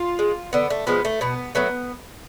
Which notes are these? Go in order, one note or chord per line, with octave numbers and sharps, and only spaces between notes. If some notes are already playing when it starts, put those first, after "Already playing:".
Already playing: F4
G#3
D3 B3
A3
F3 G#3 B3
A3
B2 B3
F#3 A3 B3